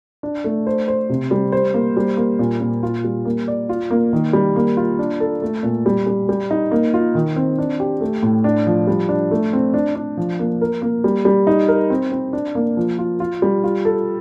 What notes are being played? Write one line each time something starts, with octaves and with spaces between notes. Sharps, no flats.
D4
A3
C5
C5
C3
G3
C5
A#3
G3
A#3
A#2
A#2
F4
G3
A#3
D5
F4
A#3
D#3
G3
A#3
F4
D4
A4
A3
A#2
G3
G3
G3
D#4
A#3
F4
D#3
C4
D4
G4
A3
A2
D4
F3
G3
D4
A3
C4
D4
D4
F3
A#3
A#4
A#3
G3
G3
D#4
A#4
C4
C4
D4
A#3
F3
F4
F4
G3
F4
A4